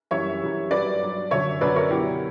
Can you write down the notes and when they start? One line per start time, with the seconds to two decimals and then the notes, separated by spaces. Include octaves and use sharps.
0.11 F#2 E3 G3 C#5 E5
0.42 F#2 E3 G3
0.71 G2 F#3 B4 D5
1.02 G2 F#3
1.31 F#2 D3 F#3 C#5 E5
1.61 F#2 D3 F#3 B4 D5
1.76 A#4 C#5
1.91 B2 F#3 E4 G4